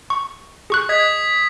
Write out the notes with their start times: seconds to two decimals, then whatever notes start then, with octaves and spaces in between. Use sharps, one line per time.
0.10 C#6
0.70 G#4 C#6 F#6
0.89 D#5 D#6 G#6 B6